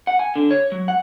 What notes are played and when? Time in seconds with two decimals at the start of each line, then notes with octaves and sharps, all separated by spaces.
0.07 F#5
0.19 G#5
0.36 D3
0.51 C#5
0.72 F#3
0.88 F#5